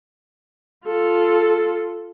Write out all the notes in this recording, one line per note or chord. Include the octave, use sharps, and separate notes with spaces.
F4 A4